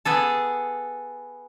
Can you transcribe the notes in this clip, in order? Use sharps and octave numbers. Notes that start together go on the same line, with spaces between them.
B3 G#4 A4